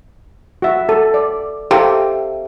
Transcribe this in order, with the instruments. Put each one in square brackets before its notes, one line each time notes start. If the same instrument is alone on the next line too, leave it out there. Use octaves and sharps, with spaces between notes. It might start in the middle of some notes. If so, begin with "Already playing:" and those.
[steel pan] F#4 E5
A4
D5
[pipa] C3 [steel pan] G4 A4 F5